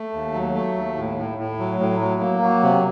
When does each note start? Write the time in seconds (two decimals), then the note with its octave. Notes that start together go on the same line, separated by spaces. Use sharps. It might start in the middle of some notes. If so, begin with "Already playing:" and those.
Already playing: A3
0.13 D#2
0.33 F#3
0.54 A3
0.76 D#2
0.96 A2
1.17 A2
1.38 A2
1.59 F#3
1.80 A2
2.01 F#3
2.21 A#3
2.42 F#3
2.63 C3